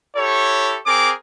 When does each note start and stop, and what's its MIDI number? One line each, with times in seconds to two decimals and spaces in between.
0.16 0.77 64
0.16 0.77 67
0.16 0.77 69
0.16 0.77 73
0.86 1.10 60
0.86 1.10 68
0.86 1.10 70
0.86 1.10 86